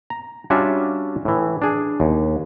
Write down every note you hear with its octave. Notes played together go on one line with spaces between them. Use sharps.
A#5
G3 C#4 D4 F4 F#4 E5
A2 E3
D4 G#4
D#2